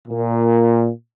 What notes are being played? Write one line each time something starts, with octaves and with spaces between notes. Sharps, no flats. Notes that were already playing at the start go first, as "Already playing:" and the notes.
A#2